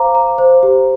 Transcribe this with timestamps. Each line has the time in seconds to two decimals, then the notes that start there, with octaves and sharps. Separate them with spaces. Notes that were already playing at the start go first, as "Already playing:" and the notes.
Already playing: C5 F5 A#5 D6
0.15 A#5
0.38 C5
0.63 G4